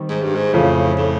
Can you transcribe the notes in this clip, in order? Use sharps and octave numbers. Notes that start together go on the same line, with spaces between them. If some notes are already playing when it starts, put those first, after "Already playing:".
Already playing: D#3 G3 C4
G#2
G2
G#2
F2 A2 C#3 F3
A2